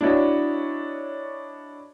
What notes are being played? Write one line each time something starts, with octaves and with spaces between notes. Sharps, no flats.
D4 E4 F#4 C#5 D#5